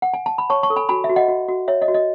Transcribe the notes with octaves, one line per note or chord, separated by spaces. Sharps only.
F#5
G#5
A5
B5
C#5 A5 C#6
A5 C#6
A4
G#5 B5
F#4 G#5 B5
E5
F#4
D#5 F#5
F#4
F#4
C#5 E5
D#5
F#4
D#5